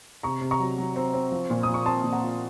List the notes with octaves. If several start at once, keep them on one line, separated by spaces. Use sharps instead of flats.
C3 A#5 C#6
C3
A#5 C#6
F#3
F#3
C4
C4
F3
A#2
F3 D#6
C#6
C4 A5 C6
A#2
F#5 A#5
F4